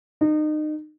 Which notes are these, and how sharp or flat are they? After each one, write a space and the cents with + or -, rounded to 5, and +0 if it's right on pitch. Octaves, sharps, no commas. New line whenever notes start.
D#4 -30